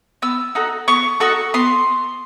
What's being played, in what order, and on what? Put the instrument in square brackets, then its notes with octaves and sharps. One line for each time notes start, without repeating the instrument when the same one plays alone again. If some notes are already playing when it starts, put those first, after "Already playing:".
[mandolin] B3 E6
D#4 F#4 A4
B3 C#6
D#4 F#4 A4 C#6
B3 C6